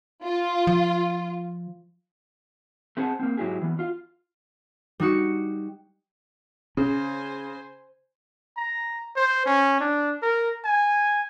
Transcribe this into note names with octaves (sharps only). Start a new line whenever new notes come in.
F4
F3
A3 C4 G#4 C5 F#5 A5
A#3 C4
G#2 F#3 E4 G4 G#4
E3 B3
F4 F5
G3 D#4 F#4 C#7
C#3 C#4 C5 G#5
A#5
C5
C#4
D4
A#4
G#5